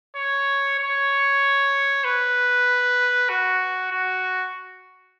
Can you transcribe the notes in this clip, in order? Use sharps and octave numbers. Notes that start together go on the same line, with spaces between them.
C#5
C#5
B4
F#4
F#4